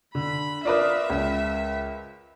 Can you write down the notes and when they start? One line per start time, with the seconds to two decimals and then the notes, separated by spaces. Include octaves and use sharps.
0.15 D3 B5
0.65 F4 A#4 B4 D5 E5 D6 D#6
1.10 C#2